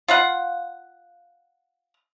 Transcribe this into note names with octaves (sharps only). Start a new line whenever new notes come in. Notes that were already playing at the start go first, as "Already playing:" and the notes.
F4 F5 F#5